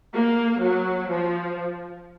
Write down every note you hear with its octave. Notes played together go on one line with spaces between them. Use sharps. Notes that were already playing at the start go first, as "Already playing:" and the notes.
A#3
F#3
F3